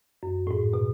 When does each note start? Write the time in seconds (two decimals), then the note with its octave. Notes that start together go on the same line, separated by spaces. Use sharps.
0.23 F#2
0.47 A2
0.51 G#2
0.74 B2